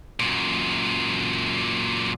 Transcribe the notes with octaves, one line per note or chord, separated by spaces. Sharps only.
F#2 A#2